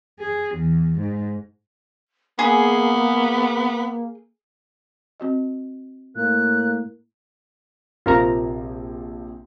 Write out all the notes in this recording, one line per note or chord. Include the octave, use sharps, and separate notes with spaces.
G#4
E2
G#2
A#3 B3 G#4
C4 F#4 D#5
A2 A#3 F#6
A#1 C3 F3 F4 A#4 A#5